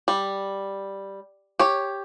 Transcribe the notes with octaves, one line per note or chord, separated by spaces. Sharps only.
G3
G4 C#5